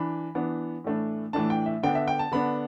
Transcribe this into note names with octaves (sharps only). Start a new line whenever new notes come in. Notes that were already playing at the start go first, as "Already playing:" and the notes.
Already playing: E3 D4 B5
E3 B3 D4
A2 E3 A3 D4
A2 E3 A3 D4 A5
G5
E5
D3 B3 D4 G5
E5
G5
A5
D3 B3 D4 B5